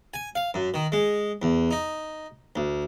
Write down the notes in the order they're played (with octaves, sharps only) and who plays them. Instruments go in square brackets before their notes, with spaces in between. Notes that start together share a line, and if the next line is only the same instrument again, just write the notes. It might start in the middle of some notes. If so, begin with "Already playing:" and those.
[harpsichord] G#5
F5
F#2
D#3
G#3
E2
D#4
D2